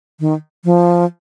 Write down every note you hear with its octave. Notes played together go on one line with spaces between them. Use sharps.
D#3
F3